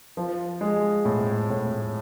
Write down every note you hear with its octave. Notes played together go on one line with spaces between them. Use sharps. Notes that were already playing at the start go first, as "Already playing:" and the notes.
F3
G#3
A2
A2